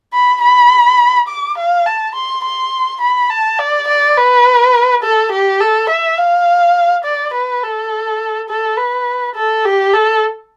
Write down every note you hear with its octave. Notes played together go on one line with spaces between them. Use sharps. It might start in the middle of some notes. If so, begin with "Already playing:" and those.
B5
B5
D6
F5
A5
C6
C6
B5
A5
D5
D5
B4
A4
G4
A4
E5
F5
D5
B4
A4
A4
B4
A4
G4
A4